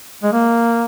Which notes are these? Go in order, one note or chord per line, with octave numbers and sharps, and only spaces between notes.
G#3
A#3